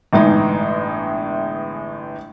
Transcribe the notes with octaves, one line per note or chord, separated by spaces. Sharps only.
G1 A2 E3 G#3 D#4